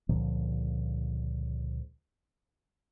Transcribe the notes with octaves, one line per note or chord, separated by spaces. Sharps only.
C#2 A#2 D3 F3